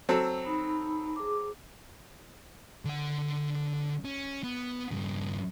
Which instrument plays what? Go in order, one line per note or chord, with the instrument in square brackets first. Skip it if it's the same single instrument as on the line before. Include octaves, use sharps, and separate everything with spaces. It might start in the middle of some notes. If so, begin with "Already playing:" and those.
[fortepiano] F#3 C4 A4
[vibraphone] D#4 B5
G#4 D6
[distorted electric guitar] D3 F#5
C#4
B3
G2 C#3